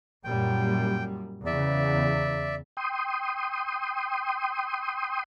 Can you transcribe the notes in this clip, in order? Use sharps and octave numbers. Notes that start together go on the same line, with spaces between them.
F#2 A#2 G3 G5
E2 C#3 D5 E5
G5 C6 D#6